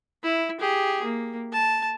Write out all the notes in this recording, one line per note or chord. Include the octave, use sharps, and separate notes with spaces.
E4
G4 G#4
A#3
A5